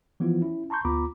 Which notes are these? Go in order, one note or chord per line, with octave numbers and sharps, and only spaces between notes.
E3 F3 B3 E4 F4
C#4 E4
A5 A#5 C6 C#6 G6
D2 B3 F4 A#5 B5 D6